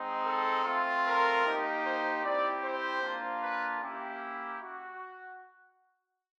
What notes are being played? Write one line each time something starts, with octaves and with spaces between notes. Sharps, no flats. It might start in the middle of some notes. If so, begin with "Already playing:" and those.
Already playing: G#3 C4 D#4
A4
A3 C4 F4
A#4
A#3 D#4 G4
C5
C4 E4 G4 D5
C5
A#3 D4 F4
B4
A#3 C#4 E4 G4
F#4